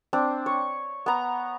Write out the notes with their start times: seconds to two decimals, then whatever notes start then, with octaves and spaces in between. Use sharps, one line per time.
0.13 C4 D4
0.46 C#5
1.06 B3 A#5